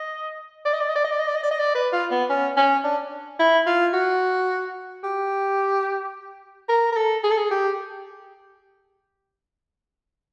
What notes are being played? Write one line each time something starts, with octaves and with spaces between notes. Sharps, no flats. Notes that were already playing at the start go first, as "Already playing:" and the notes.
Already playing: D#5
D5
D#5
D5
D#5
D5
D#5
D5
D#5
D5
D#5
D5
D#5
D5
B4
F4
B3
C#4
C#4
D4
E4
F4
F#4
G4
A#4
A#4
A4
G#4
A4
G#4
G4